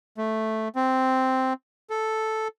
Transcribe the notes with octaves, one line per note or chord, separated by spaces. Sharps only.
A3
C4
A4